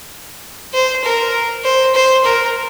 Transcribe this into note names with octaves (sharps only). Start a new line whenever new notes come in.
C5
A#4
C5
C5
A#4